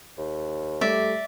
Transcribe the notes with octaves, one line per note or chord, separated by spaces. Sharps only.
D#2
G3 A3 D5 E5